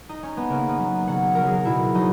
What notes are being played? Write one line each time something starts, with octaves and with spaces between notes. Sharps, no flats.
D#4
C#4
B3
C#3 A#3
B3
F#3
C#3 F#5
F#3 A#4
G#4
B2 E4
F#3 D#4